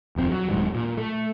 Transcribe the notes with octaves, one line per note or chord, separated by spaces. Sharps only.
D#1 F2 C4
F#3
D#1 G#2 F#3 G3
A#2
A3